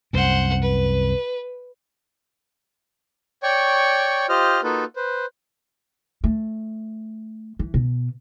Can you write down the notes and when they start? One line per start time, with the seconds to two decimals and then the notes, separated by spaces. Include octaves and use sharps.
0.13 C2 F#2 C5 F#5
0.62 B4
3.43 C#5 D5 G5 C#6
4.29 F4 G4 C5 D#5 F6
4.64 A#3 D#4 F4 F#4 A4 B4
4.96 B4 C5
6.24 A3
7.59 E3
7.74 B2